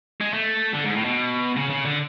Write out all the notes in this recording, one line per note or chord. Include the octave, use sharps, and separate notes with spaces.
G#3
A3
D3
G#2
A2
B2
C#3
C#3
D3